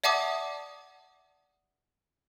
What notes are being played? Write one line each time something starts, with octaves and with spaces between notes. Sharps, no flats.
D5 E5 F#5 A5 D6 D#6